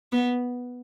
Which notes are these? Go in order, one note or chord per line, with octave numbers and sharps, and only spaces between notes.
B3